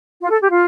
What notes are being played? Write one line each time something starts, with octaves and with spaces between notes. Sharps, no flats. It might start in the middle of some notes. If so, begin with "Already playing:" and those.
F4
A4
G4
F4